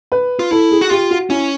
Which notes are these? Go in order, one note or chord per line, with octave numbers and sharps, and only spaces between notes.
B4
F4
E4 A4
G#4
F#4
F4 G4
F#4
C#4 E4